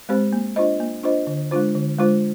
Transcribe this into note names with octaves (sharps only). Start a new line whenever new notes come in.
G#3 C4 G4 C5
A#3
D4 F4 C5 D#5
A#3
D4 F4 C5 D#5
D3
G#3 D4 F4 C5
D3
G#3 D4 F4 C5